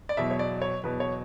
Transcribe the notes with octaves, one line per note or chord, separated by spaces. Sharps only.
D5
E2 B2 F#3 E5
C#5
D5
C#5
E2 B2 F#3 B4
C#5